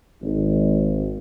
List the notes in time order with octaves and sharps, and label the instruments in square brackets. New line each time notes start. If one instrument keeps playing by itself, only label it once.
[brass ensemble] G#1